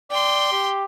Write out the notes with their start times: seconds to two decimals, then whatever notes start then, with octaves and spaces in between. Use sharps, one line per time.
0.11 D5 G5 C6
0.52 G4